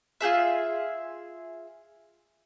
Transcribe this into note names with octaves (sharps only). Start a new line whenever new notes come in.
F4 G4 G#4 E5